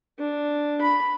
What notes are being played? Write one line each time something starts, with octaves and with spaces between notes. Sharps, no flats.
D4
B5